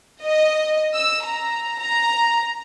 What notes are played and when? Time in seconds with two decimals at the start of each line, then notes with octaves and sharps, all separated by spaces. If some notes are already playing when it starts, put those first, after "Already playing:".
0.22 D#5
0.94 E6
1.24 A#5
1.78 A#5